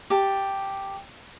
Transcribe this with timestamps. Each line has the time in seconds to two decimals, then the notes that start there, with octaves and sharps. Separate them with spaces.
0.10 G4 A5